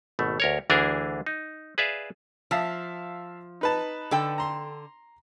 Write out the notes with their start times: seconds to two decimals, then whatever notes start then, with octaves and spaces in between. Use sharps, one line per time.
0.19 G#1 B2 A3
0.40 D2 A#4 C#5
0.70 D2 E3 D4 G#4 A#4
1.26 D#4
1.78 G#4 B4 D5 E5 F5
2.51 F3 E5 F5 A5
3.61 D#4 B4 A5
4.11 D3 A4 G5
4.38 A#5 C6